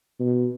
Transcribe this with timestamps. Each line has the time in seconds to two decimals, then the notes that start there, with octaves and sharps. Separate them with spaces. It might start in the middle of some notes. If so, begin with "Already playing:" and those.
0.20 B2